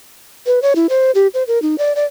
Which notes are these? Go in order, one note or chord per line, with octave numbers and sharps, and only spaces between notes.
B4
C#5
E4
C5
G4
C5
A#4
D#4
D5
D5